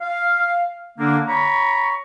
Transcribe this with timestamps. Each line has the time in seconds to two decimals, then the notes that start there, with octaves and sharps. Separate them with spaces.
0.01 F5
0.99 D3 A#3 D4
1.28 C#5 A#5 B5 C#6